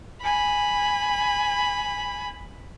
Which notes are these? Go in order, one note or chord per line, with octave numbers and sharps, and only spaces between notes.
G#5 B5